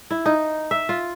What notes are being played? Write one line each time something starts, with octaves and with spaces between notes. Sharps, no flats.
E4
D#4
E5
F4